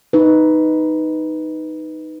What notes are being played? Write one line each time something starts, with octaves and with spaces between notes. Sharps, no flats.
D#4 B4